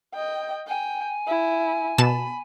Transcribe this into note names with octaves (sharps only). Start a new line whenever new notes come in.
D#5 G5
G5 G#5
E4
B2 A5 B5 E7